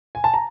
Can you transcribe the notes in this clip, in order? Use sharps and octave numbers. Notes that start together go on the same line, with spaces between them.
G#5
A5
A#5